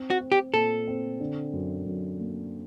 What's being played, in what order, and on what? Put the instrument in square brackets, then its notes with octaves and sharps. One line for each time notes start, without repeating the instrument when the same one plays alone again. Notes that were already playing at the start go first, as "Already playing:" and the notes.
Already playing: [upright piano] C4
[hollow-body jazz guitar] F#4
[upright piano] C4
[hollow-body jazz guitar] G4
[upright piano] A#2 [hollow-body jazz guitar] A4
[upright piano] C4
D3
F#2
F#2
A#3